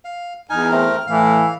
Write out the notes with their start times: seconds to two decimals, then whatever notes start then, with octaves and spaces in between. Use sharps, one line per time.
0.05 F5
0.50 E2 D#4 G#5 F6
0.71 A3 C4 A#4
1.07 A2 E3 F5